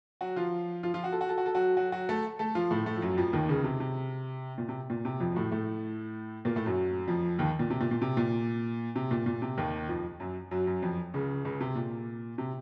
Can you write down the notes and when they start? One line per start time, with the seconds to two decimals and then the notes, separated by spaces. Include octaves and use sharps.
0.21 F#3 F#4
0.36 F3 F4
0.83 F3 F4
0.94 F3 F4
1.04 F#4
1.12 A4
1.21 F#4
1.29 A4
1.38 F#4
1.46 A4
1.54 F#3 F#4
1.77 F#3 F#4
1.92 F#3 F#4
2.09 A3 A4
2.39 A3 A4
2.55 F3 F4
2.71 A2 A3
2.86 A2 A3
2.96 F3
3.02 F#2 F#3
3.17 F2 F3
3.33 D#2 D#3
3.49 C#2 C#3
3.64 C3
3.80 C3
4.58 A#2
4.69 C3
4.90 A#2
5.05 C3
5.20 F2 F3
5.32 F#3
5.36 A2 A3
5.52 A2 A3
6.45 A#2 A#3
6.56 A2 A3
6.66 F#2 F#3
7.08 F2 F3
7.39 D#2 D#3
7.59 A#2
7.70 C3
7.81 A#2
7.91 A#2
8.02 C3
8.17 A#2
8.96 C3
9.11 A#2
9.26 A#2
9.42 C3
9.58 D#2 D#3
9.89 F2 F3
10.20 F#2 F#3
10.51 F#2 F#3
10.67 F#2 F#3
10.82 F2 F3
11.14 C#2 C#3
11.45 C#2 C#3
11.61 C3
11.76 A#2
12.38 C3